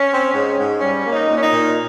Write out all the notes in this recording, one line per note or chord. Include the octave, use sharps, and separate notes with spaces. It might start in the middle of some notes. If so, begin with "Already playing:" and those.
Already playing: C#4
C4
G#2
G#2
G3 C#4
A#3
D#4
A#2
C#4
D#4
A#2